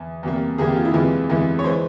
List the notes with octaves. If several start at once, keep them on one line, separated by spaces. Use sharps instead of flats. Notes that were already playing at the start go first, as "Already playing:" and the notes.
Already playing: E2
E2 C3 G3 A#3
E2 C3 G3 A#3 G#4
G4
F4
E4
E2 C3 E3 G#3 F4
E2 C3 E3 G#3
C#5
E3 G#3 C5